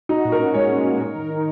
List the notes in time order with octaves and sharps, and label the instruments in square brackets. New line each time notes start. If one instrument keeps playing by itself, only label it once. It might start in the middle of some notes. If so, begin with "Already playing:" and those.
[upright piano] D#4 [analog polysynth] F#4
[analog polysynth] A#2
[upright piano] A#4
[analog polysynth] C#4
[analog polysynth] G#3 [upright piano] C#5
[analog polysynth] F#4
A#2
A#4
D#3
D#4